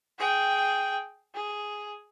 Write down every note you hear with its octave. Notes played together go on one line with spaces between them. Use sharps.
G#4 G5
G#4